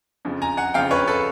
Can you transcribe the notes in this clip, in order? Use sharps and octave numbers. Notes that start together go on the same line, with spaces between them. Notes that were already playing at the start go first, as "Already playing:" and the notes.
F2 C#3 F3
G#5 A#5
F#5 G#5
F2 C#3 F3 F5 G5
B4 C#5
A4 B4